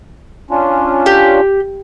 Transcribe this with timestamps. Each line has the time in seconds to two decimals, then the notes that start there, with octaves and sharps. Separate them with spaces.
0.51 C#4 D4 F4
1.06 G4